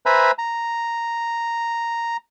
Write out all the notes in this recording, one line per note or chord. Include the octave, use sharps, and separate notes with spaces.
B4 C5 E5 G#5 A#5 B5
A#5